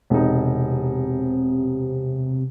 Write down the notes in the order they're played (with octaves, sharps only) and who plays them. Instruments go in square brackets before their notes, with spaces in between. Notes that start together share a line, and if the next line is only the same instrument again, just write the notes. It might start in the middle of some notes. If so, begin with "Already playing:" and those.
[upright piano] E1 D#4 [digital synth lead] C3